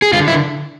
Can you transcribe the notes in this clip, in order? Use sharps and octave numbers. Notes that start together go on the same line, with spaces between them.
G#4
D3 F4
E4